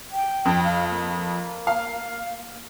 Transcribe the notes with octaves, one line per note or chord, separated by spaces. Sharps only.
G5
F2
F5
A#3
F5